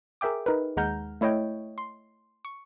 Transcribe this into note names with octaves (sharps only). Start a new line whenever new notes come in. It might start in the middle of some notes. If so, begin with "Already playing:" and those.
G#4 A#4 E5 G5 D6
D#4 A#4 B4
D#2 G#3 F#5 A#5 F6 G6
A3 E4 C#5 D#5 G5
C6
C#6